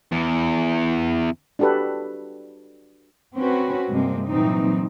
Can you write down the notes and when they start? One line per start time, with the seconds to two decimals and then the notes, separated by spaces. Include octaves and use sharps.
0.12 E2
1.59 D4 F#4 G4 A4 B4
3.36 C4 C#4 F#4 B4
3.90 G2 C3 G#3 A#3 C4
4.27 A#2 E3 F#3 G3 C4 D#4